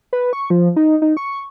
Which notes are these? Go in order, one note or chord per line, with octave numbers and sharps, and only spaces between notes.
B4
C#6
F3
D#4
D#4
C#6